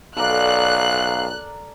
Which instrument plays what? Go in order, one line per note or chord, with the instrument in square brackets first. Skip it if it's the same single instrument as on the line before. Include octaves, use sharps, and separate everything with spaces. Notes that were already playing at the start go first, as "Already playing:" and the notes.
[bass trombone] B1 [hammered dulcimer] A4 A#4 D5 [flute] F5 [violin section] F#6